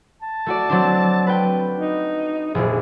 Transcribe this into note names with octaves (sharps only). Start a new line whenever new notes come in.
A5
A3 F#4 D5
F#3 C4 D4
B4 G5
D#4
F1 A#1 G#4